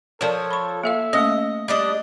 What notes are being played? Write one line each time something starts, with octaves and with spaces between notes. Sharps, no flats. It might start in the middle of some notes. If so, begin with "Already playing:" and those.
F3 A4 A#4 C#5 D5 A5
B5 C#6
A#3 A4 E5 F5
A3 A#3 C#4 D#5
G3 D4 D5 D#5